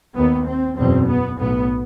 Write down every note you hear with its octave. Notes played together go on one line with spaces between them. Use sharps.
D#2 B3
C4
F#1 E2 B2 C4
B3
B1 A2 B3